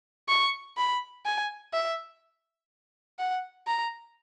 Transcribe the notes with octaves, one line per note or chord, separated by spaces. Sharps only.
C#6
B5
G#5
E5
F#5
A#5